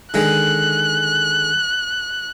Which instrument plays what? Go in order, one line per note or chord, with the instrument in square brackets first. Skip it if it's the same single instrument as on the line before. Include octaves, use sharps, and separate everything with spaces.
[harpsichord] D3 D#3 G#3 [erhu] F#6